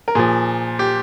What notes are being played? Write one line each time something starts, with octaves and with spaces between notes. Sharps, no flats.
A#4
A#2 F3 G#4
G4